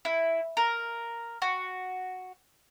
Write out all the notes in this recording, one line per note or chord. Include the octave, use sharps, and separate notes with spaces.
E4
A#4
F#4